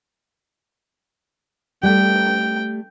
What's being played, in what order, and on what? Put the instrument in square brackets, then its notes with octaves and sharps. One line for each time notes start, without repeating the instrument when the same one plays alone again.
[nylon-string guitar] G3 A3 [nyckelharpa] G5